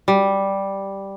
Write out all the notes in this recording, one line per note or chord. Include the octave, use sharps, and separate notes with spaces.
G3